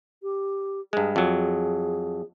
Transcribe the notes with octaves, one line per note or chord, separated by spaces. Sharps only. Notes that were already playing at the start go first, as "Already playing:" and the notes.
G4
G2 G#3 G#4
F2 F#3